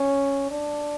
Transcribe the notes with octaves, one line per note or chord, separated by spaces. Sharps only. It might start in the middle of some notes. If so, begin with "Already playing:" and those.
Already playing: C#4
D4